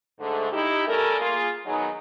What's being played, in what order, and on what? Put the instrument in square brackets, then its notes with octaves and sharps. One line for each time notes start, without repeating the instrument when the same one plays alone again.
[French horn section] G#2 D3 A3
D#4 E4 G4
G3 A3 C#4 A4 A#4
A#3 F4 G#4
D#3 F#3 B3 D#4 G#4